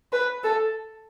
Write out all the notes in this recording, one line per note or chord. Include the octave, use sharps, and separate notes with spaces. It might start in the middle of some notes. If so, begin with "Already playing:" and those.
B4
A4